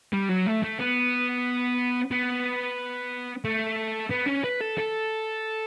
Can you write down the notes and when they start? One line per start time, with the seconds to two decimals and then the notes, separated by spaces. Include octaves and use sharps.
0.13 G3
0.29 F#3
0.46 A3
0.62 A3
0.79 B3
2.11 B3
3.45 A3
4.11 B3
4.27 C#4
4.44 B4
4.61 A4
4.78 A4